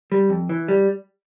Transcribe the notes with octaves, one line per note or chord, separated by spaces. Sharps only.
G3
F2
E3
G3